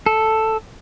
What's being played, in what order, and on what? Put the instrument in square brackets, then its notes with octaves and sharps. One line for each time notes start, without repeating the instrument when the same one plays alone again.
[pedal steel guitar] A4